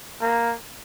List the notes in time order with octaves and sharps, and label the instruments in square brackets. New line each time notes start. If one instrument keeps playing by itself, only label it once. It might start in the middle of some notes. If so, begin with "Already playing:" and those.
[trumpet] A#3